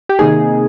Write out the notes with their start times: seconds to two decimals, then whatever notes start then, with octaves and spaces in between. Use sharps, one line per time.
0.09 G4
0.19 C3 D#3 A#3 D#4 G#4